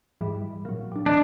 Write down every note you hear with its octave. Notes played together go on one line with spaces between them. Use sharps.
G#2 E3 G3
A#2 F#3
G3 D4
E3 D4 D#5 D7